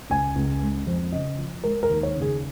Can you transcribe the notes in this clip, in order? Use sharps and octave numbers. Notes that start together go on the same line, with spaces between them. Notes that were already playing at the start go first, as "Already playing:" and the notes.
C#2 G#5
C#2
G#3
F2
C#3 D#5
F3
G#3 A#4
A#4
D#2
C#5
C#3
G#4